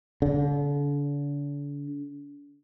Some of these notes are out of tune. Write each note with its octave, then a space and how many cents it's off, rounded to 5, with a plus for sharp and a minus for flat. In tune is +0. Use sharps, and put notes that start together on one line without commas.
D3 -40